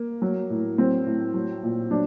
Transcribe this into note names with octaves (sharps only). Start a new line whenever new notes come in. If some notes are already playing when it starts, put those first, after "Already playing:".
Already playing: A#3
F#3
A2
F#3 C4
A2
F#3
A#2
F#3 D4